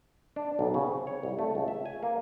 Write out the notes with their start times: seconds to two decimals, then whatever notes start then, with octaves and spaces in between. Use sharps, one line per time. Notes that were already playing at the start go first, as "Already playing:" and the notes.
0.36 D4
0.59 B1
0.74 C#3
0.88 C4
1.07 C#5
1.23 C2
1.39 A3
1.55 C#2
1.68 E5
1.86 G#5
2.03 A#3